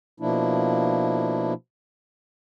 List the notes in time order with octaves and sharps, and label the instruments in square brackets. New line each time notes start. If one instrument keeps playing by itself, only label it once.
[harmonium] B2 F3 A#3 D4 E4